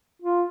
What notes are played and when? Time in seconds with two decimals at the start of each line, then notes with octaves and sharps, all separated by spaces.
0.22 F4